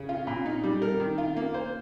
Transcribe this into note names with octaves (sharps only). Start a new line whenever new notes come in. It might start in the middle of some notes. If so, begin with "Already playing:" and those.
Already playing: C#3
F4
A#2
D#4
G3
A#4
D#3
F4
A#3
C5